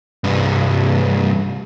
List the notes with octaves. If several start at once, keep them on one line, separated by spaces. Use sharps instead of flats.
C2 G2